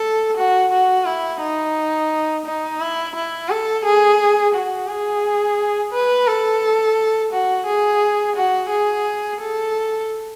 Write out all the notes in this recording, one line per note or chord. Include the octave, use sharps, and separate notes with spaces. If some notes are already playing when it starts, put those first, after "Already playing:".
Already playing: A4
F#4
F#4
E4
D#4
D#4
E4
E4
A4
G#4
F#4
G#4
B4
A4
F#4
G#4
F#4
G#4
A4